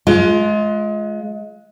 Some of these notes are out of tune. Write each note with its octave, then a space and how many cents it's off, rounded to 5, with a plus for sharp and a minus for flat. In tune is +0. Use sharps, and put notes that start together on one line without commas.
G#3 +30 F4 +0